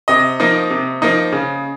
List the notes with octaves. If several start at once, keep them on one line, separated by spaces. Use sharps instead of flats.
C3 D#5
F3 A#3 D#4
C3
F3 A#3 D#4
C#3